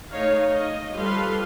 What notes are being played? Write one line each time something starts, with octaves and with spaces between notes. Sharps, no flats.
A3 D#4 C#5 F5
D#5
F3 G3 A4 B4 F5 C6